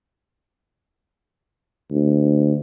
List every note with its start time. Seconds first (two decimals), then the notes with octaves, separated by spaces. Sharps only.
1.91 D2